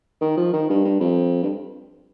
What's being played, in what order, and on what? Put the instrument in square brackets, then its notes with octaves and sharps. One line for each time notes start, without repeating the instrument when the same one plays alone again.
[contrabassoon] D#3
F3
D#3
G2
G2
F2
G2